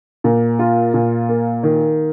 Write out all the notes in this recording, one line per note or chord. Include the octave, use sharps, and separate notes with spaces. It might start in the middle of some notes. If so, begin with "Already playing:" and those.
A#2
F4
A#2
A#3
D#3